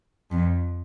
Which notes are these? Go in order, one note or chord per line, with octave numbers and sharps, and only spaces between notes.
F2